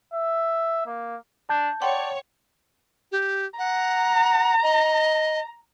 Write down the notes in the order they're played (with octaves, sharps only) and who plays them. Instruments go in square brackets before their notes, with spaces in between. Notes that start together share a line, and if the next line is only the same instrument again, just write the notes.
[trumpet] E5
A#3
[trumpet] D4 [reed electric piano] A5 G6
[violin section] C#5 [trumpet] D5 [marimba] F#5 G5 C6
[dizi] G4
[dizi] F#5 [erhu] A#5
[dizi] D#5